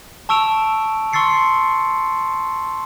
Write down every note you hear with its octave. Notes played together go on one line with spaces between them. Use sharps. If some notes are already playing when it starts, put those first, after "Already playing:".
A5 C#6 E6 D7 E7 F7
C6 C#6 E6 A6 C7 C#7